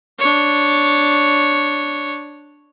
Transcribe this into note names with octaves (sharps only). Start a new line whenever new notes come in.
D4 C#5